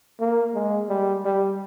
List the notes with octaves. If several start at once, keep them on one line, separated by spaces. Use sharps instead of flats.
A#3
G#3
G3
G3